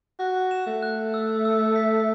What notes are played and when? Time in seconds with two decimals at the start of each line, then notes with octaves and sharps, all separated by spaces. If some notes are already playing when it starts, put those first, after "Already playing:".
0.19 F#4 F#6
0.51 E7
0.67 A3
0.82 F#6
1.14 E6
1.45 E6
1.76 B6